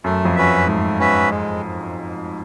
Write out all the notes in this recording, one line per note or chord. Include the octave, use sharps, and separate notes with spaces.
F#2 A3
F2
C#4 F#4 B4 E5
F#2
G#2 A3
C#4 F#4 B4 E5
G#3